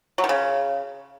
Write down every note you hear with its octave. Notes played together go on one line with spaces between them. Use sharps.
F#3
D#3
C#3